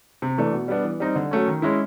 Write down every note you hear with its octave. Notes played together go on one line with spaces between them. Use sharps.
C3
E3 A3 D4
B2
G3 B3 D4
E3
G3 C4 D#4
D3
F#3 A3 C#4
D#3
G#3 C#4 E4